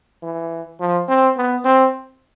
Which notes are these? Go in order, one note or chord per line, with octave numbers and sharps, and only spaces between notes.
E3
F3
C4
B3
C4